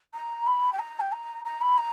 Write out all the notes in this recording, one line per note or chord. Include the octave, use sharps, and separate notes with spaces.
A#5
B5
G5
A#5
G5
A#5
A#5
B5
A#5